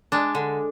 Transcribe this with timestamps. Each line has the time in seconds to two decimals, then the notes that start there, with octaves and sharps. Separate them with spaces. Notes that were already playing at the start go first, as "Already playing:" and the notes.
0.12 G#3 D4
0.35 D3